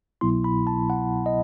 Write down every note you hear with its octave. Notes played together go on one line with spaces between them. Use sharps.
C2 B2 F#3 B3 E4 C6
B5
A5
F#5
D#5